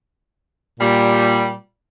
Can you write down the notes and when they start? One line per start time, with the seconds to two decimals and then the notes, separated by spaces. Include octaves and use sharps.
0.80 A#2 G3